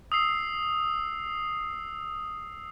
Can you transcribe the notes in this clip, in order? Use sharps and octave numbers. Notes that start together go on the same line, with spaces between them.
D#6 E6 C7